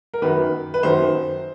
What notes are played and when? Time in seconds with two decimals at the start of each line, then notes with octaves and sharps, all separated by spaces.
0.14 A#4
0.22 F#2 D#3 B4
0.74 B4
0.83 F#2 D#3 C5